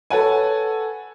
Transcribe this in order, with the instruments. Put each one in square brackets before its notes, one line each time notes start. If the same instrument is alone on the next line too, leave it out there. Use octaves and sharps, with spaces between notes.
[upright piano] A4 B4 C#5 F#5 G#5